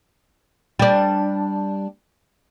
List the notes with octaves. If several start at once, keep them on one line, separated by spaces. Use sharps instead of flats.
G3 D4